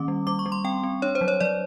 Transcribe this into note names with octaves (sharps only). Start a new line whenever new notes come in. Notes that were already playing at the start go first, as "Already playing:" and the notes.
Already playing: D#3 A#3 C#4 D6
G3
G3 D6
C#6
G3
C6
C4 G5
C4
D4 C#5
C5
F#3
C#5
F#3 D5